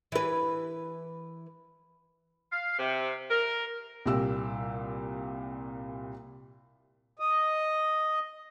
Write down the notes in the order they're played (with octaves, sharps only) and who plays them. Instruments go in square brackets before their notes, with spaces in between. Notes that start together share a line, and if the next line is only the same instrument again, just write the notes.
[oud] E3 B4
[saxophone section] F5
C3
A#4
[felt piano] C2 A#2 G4 E6
[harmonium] D#5